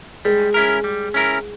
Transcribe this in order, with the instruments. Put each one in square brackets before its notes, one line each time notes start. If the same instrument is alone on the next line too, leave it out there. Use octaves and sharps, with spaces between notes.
[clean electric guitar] G3 [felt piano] G#3
[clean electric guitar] C#4 E4 A#4
G3
C#4 E4 A#4